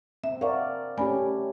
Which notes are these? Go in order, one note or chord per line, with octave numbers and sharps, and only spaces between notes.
C4 E5
A#4 D5 F5 F#5 C#6
A3 C#4 G4 D5 G#5 B5